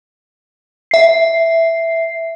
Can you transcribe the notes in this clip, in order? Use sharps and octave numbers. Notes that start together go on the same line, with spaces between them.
E5 C7